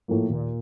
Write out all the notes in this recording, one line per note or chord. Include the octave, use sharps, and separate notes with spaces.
A2 F3 A#3
D#2 A#2